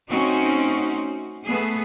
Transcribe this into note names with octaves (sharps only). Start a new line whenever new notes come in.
A3 C4 C#4 D#4 F#4
A3 B3 G#4